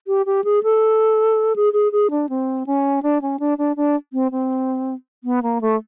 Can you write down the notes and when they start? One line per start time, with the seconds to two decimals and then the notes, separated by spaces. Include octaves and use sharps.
0.07 G4
0.26 G4
0.44 G#4
0.63 A4
1.56 G#4
1.73 G#4
1.92 G#4
2.10 D4
2.29 C4
2.66 C#4
3.03 D4
3.22 C#4
3.39 D4
3.58 D4
3.76 D4
4.13 C4
4.31 C4
5.24 B3
5.42 A#3
5.61 A3